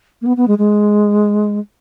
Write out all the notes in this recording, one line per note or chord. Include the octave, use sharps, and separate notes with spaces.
A#3
B3
B3
G#3
G#3